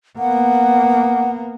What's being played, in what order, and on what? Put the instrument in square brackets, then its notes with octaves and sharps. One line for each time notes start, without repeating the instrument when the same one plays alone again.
[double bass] A#3 B3 [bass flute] F#5